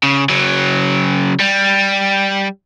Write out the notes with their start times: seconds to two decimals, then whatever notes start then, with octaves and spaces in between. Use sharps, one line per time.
0.03 C#3
0.29 C#3 F#3
1.39 G3